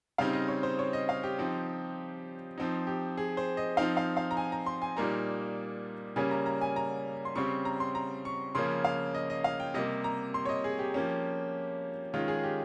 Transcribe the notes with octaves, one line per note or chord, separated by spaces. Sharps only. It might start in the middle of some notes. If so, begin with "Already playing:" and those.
C#3 G3 C4 D#4 F5
D#5
C#5
C5
C#5
D#5
F5
G4
F3 C4 D#4
F3 C4 D#4
G4
G#4
C5
D#5
F3 C4 D#4 F5
F5
F5
A#5
G#5
A#5
C6
G#5
A#2 G3 A#3 D#4 A#5
C#3 G3 A#3 C#4 G#5
A#5
A#5
G#5
A#5
C6
C#3 G3 C4 C#6
A#5
C6
A#5
C#6
C#3 F3 A#3 C#4 C6
F5
D#5
D#5
F5
G5
C3 G3 A#3 D#5
A#5
C6
C#5
D#5
G#4
G4
F3 A#3 C#4
D#3 G#3 C#4 F4
G#4
G4